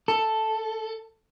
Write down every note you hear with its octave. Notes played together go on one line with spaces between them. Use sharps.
A4